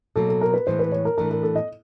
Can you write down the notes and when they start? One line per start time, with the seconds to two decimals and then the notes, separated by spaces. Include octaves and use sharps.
0.16 B2 F#3 A#3 A4
0.29 A4
0.41 A#4
0.54 B4
0.67 A2 E3 G#3 C5
0.79 B4
0.92 C#5
1.05 A#4
1.18 A2 E3 A3 D4 A#4
1.31 A#4
1.43 A4
1.55 D#5